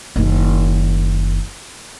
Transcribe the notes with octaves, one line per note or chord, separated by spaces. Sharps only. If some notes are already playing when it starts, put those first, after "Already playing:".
F#1 D#3